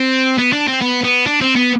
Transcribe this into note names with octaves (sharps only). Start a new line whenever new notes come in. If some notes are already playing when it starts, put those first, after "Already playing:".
Already playing: C4
B3
D4
C4
B3
B3
D4
C4
B3